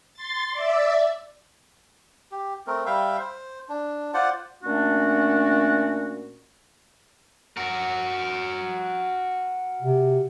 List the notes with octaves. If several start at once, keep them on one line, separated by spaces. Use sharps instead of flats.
C6 A6
D5 E5
G4
A3 C4 A#4
G3 E5 F5 G5
C5
D4
F4 C5 D5 F#5
A#2 A3 C#4 D4 F#4
F#4 A#4
C3